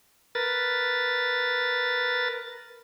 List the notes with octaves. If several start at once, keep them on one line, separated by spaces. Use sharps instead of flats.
A#4 B4 A6